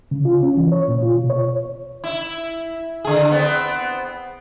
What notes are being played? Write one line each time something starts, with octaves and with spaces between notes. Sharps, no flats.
C#3
F4
C#4
E3
C#5
A#2
F4
B2
C#5
E4
D3 G#4
B3 C4